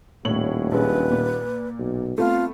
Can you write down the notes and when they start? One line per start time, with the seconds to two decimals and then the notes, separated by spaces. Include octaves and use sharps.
0.25 D#1 A2 C#5 F#7
0.72 A#1 G#3 C#4 B4
1.12 A#2
1.79 B1
2.18 A3 B3 C4 F4